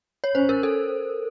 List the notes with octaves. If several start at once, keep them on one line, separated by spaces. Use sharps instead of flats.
C#5
C#4 C5
A#4
A4